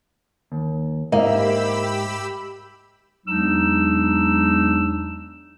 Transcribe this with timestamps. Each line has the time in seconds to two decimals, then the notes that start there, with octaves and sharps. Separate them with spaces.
0.52 D#2
1.12 G#2 A#3 G4 D#5 E5 B5 E6
3.27 E2 F#3 G#3 D4 D#4 E6